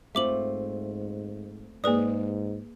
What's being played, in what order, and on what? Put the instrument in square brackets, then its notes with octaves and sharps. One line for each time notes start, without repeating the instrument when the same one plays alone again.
[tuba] G#2 [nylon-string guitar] A3 C4 F4 [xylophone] E5 D6 F#7
[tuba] G#2 [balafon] A#3 D5 [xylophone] G#4 B4 D#6